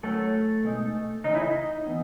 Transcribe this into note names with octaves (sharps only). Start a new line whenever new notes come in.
F#3 A3 C#4 E4 A4
B2 G#3 D#4
C#3 E3 A3 D#4 D#5
E4 E5
D#4 D#5
E3 B3 D#4